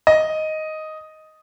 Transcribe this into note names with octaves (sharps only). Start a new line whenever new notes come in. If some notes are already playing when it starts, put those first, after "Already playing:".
D#5